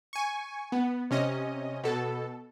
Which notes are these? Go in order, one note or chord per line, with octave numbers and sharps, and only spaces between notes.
G#5 C#6
B3
C3 C#4 D#5
B2 A4